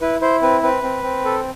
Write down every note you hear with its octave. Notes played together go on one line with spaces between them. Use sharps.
E4 B4
E4 C5
C4 B4
C4 B4
C4
C4
A4